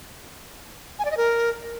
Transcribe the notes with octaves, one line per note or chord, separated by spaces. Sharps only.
G#5
D5
D#5
A#4